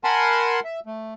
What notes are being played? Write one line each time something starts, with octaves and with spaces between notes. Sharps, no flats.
A#4 F#5 G#5 A5 B5 C6
E5
A3